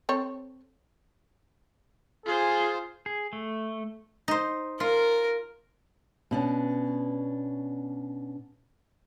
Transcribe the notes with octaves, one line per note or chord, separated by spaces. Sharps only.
C4 A4 C#5
F4 G#4 C5
G#4
A3
D#4 C5
F4 A#4
B2 C#4 D4